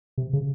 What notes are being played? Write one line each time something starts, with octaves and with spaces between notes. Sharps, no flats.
C3
C#3